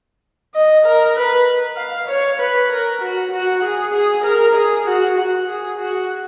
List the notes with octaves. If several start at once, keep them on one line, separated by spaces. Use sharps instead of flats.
D#5
A#4
B4
F5
C#5
B4
A#4
F#4
F#4
G#4
G#4
A#4
G#4
F#4
F#4
G#4
F#4